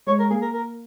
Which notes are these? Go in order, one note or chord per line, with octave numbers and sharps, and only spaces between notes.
G#3 C#5
A#4
A#3 G#4
A#4
A#4